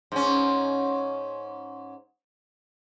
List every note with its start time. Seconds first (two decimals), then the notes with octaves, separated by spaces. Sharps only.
0.12 G#2 C#4